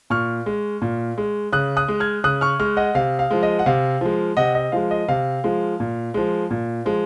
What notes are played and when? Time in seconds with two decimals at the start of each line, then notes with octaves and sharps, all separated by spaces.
0.10 A#2 C#6 F6
0.46 G#3
0.82 A#2
1.18 G#3
1.53 C#3 D#6 F#6
1.77 D#6 F#6
1.88 G#3
2.00 F6 G#6
2.24 C#3 D#6 F#6
2.41 C#6 F6
2.59 G#3 C#6 F6
2.77 D#5 F#5
2.95 C3 F5
3.19 F5
3.31 F3 G#3
3.43 D#5
3.59 F#5
3.66 C3 F5
4.01 F3 G#3
4.37 C3 D#5 F#5
4.55 D#5
4.72 F3 G#3 F5
4.91 D#5
5.08 C3 F5
5.44 F3 G#3
5.80 A#2
6.14 F3 G#3
6.50 A#2
6.86 F3 G#3